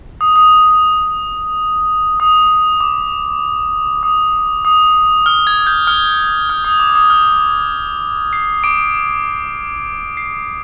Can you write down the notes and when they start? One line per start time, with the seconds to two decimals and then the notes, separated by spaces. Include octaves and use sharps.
0.21 D#6
0.36 D#6
2.20 D#6
2.80 D6
4.03 D#6
4.65 D#6
5.26 F6
5.47 G#6
5.67 G6
5.87 F6
6.49 F6
6.64 D#6
6.80 D6
6.90 D6
6.95 D#6
7.10 F6
8.33 C7
8.64 D6 D7
10.17 C7